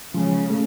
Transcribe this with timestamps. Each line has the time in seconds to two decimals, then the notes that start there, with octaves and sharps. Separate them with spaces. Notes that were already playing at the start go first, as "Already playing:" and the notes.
0.14 C#3 F3 G#3
0.50 A3